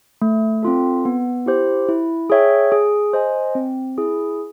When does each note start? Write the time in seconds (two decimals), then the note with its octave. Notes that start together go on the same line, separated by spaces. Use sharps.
0.22 A3
0.63 C4 F4 A4
1.05 B3
1.46 E4 G4 C5
1.89 E4
2.30 G#4 C#5 E5 G5
2.72 G#4
3.13 C5 D#5 G#5
3.55 C4
3.98 E4 G#4